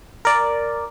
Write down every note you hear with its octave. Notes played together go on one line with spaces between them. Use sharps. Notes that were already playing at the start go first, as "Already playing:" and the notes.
A#4 D5